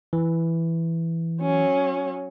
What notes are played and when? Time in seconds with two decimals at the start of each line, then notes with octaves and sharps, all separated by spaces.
0.13 E3
1.42 F#3 C#4